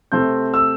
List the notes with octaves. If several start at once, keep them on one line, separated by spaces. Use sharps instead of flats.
C3 A3 C4 G6
E6